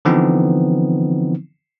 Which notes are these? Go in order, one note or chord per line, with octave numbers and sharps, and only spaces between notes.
D3 E3 F3 B3 C4 D#4